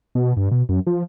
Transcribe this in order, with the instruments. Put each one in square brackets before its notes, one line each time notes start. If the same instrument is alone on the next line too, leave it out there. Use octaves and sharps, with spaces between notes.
[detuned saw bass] B2
G2
B2
F#2
F3